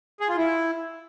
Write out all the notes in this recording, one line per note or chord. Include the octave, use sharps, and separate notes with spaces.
G#4
F4
E4